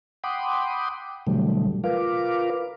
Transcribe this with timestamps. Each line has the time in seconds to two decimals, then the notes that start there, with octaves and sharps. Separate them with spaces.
0.24 F#5 G5 B5 C6 D6 D#6
1.27 B2 D3 E3 F#3 G3 A3
1.84 F4 A#4 B4 F5 D6